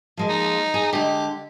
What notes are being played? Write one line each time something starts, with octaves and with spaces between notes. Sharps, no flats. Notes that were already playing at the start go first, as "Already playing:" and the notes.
F3 G#3 A#3
D#4
G#4 G#5
D3 G#3 G4